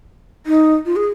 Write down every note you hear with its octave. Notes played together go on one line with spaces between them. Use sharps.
D#4
F4
G#4